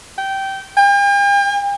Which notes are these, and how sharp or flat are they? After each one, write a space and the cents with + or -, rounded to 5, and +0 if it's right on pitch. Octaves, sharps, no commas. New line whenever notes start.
G5 -15
G5 +45